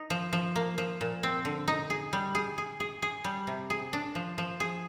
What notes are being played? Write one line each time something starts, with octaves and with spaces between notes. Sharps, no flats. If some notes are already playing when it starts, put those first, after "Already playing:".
Already playing: D#4
F3
F3
A#3
F3
A#2
C4
D3
D#4
G#4
G3
G#4
G#4
G#4
G#4
G3
C3
G#4
D4
F3
F3
G#4